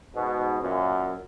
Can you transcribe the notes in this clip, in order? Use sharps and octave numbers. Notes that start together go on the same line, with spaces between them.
G#2 B2
F#2 A#2